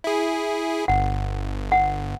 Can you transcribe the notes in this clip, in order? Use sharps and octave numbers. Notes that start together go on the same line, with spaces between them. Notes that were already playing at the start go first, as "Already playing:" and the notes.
E4 G#4
G1 F#5
F#5